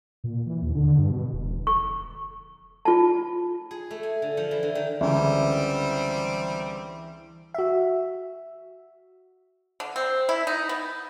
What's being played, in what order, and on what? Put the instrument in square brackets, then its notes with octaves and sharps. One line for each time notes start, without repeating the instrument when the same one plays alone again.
[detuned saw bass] A#2
E3
D#2
D3
G2
B2
E1
[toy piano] C#6
F4 A5
[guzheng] G#4
A3
G#5
D3
F3
E3
D3
D#3
[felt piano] C#2 D3 [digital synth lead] E3 [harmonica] G3 C4
[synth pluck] F#4 E5
[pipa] D3
C4
E4
D#4
B3